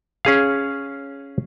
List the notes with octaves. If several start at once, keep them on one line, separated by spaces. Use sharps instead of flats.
C#4 G#4 F5